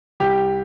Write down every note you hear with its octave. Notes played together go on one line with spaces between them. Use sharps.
C2 G4